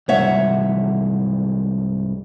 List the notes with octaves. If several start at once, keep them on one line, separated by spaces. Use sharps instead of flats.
C2 G#2 C#5 E5 F#5